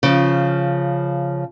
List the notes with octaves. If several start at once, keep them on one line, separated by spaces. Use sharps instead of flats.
C#3 F3